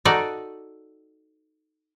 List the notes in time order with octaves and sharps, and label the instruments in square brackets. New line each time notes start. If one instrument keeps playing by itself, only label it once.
[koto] D#4 F#4 A4 D5